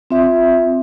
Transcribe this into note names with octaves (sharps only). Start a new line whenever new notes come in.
C4 F4 E5